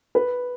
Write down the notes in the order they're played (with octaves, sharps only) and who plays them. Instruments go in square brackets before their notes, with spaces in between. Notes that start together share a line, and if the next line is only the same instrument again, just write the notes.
[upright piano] B4